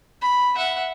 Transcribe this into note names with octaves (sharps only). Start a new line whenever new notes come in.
B5
E5 F#5